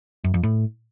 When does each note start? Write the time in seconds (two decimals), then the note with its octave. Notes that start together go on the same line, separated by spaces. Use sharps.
0.24 F#2
0.34 F2
0.43 A2